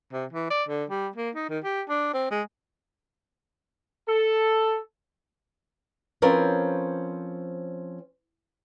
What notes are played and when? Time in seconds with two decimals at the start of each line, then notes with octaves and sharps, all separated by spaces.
0.13 C3
0.33 E3
0.50 D5
0.69 D3
0.90 G3
1.16 A#3
1.35 D#4
1.50 D#3
1.64 G4
1.89 D4
2.14 C4
2.31 G#3
4.08 A4
6.22 F3 C4 C#4 A#4 B4 C#5